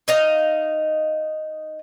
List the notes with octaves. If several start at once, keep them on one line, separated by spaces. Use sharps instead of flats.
D#4 D#5 F5